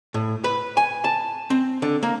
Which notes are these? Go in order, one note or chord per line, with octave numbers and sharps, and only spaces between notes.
A2
B4
G#5
A5
C4
D3
A#3